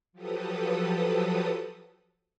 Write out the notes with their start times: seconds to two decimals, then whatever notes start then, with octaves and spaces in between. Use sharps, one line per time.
0.13 F3 F#3 G4 A4 B4 D#6